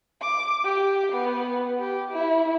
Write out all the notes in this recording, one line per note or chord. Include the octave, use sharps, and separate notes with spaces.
D6
G4
B3
G4
E4